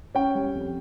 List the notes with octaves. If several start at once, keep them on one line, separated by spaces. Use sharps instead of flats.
C#4 G5
G3
F2